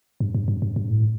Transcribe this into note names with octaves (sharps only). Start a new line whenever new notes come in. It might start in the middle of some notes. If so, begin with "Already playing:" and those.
G2
G2
G2
G2
G2
A2